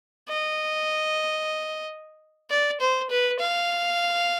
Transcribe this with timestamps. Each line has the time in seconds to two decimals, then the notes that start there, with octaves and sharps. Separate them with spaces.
0.29 D#5
2.50 D5
2.81 C5
3.10 B4
3.40 F5